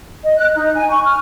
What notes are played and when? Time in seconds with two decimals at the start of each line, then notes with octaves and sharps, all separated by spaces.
0.24 D#5
0.37 F#6
0.55 D#4
0.74 G#5
0.89 C#6
1.05 F6